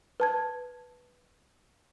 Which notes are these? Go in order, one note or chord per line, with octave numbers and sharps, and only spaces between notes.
B4 A5 G#6